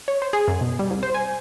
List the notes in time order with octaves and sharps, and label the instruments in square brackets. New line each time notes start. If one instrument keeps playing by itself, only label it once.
[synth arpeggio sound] C#5
C5
G#4
F#2
B2
G3
C2
C5
G#5